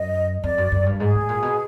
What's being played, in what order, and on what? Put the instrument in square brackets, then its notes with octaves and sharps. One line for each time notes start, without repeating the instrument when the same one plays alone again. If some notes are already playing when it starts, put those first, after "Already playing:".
Already playing: [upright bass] F#2 [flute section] D#5
[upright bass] F2 [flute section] D5
[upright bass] F#2
F#2
G2
[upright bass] G#2 [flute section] G#4
[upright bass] A2
A#2
B2